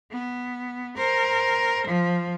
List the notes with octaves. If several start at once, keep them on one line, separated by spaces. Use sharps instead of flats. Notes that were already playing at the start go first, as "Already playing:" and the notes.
B3
A#4 C5
F3